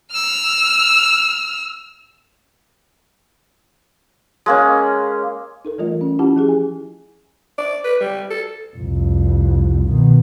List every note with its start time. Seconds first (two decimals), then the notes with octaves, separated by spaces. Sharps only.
0.11 E6 F6
4.46 G#3 A#3 C#4
5.65 D#4 A4 A#4
5.78 E3 G3 A3 F4 A#4 D#5
6.01 C#4
6.19 C#4 E4 F4 G4 F#5 A5
6.36 F3 E4 G#4
6.49 G#5
7.58 D5
7.84 B4
8.01 G3
8.31 A4
8.77 C2 F2
9.89 B2 D#3